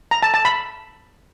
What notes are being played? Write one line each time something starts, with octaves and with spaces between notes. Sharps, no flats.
A#5
A5
A5
B5